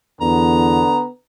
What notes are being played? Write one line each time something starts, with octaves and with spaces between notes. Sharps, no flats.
E2 D3 B3 A#5